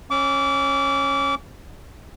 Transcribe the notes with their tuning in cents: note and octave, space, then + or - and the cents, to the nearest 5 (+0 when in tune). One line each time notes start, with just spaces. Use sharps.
C#4 -20 D6 -30